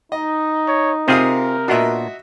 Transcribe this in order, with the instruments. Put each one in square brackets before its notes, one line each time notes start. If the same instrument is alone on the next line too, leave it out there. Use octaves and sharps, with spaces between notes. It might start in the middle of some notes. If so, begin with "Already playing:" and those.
[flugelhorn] D#4 [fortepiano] D#5
[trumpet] C#5
[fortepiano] C3 F5 D#6 [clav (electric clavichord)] C4 F4 G#4 [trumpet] A#4
[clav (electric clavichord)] A#2 B3 D4 [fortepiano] F#4 D#5 E5